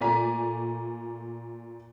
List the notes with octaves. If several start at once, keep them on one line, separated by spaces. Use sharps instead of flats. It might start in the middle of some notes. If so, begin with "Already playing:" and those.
A#2 A3 D5 G#5 A#5 B6